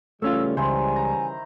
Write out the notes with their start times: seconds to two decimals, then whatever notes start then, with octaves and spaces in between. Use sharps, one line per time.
0.22 C#3 E3 G3 A3 C#4 F4 E6
0.57 C#2 D#3 E4 C5 G#5
0.96 A#5